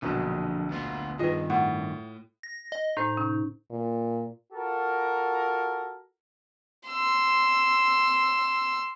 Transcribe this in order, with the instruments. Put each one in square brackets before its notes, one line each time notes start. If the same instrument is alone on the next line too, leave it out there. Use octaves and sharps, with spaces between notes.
[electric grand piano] A#1 F#2 B2 [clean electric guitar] D3 F3
[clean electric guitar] D2 B3 F4
[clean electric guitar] G2 D#3 [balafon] F4 B4 [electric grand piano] G#4 D#5
[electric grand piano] A2 [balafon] F#5
[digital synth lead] A#6
D#5
[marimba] A2 C5 [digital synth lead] D#4
[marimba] C3 C#4
[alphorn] A#2
[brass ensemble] F4 F#4 A4 A#4
[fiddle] C6 E6